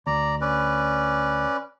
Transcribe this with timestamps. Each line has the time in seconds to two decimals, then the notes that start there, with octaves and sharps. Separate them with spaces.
0.07 D2 D5 A#5
0.41 C#4 B4 D5